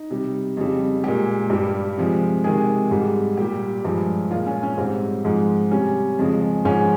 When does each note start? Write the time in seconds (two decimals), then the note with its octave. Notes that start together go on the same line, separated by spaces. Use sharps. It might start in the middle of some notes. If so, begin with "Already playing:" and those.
Already playing: D#4
0.11 C3 G3
0.57 F2 C#3 G3
1.04 A#2 G#3 G4
1.50 G2 G3
1.98 C3 F3 G#3
2.44 C3 D#3 G#3 G#4
2.91 G#2 G3
3.37 A#2 G3 G4
3.85 G2 F3 G#3
4.31 A#2 G#3 F4
4.47 C#4
4.63 C#4
4.77 G#2 G3 C4
5.25 G#2 F3 G#3
5.71 C3 G3 C#4
6.19 F2 C#3 F3 G#3
6.65 G#2 F3 G#3 C#4